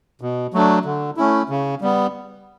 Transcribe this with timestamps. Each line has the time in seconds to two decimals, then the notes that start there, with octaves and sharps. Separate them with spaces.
0.21 B2
0.54 F#3 A3 D4
0.85 D3
1.17 A3 C#4 E4
1.49 C#3
1.81 G3 B3